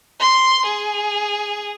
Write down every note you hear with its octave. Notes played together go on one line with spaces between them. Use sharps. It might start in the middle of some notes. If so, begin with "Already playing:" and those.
C6
G#4